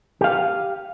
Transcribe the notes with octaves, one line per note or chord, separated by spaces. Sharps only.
G4 F5